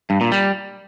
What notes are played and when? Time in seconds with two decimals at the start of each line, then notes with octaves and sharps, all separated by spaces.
0.10 G2
0.21 A#2
0.32 G3